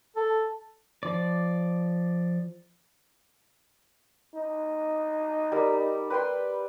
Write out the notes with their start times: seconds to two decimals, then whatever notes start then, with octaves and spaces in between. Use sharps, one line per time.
0.16 A4
1.03 F3 D5
4.34 D#4
5.52 G3 A#4
6.10 B4 G5 C6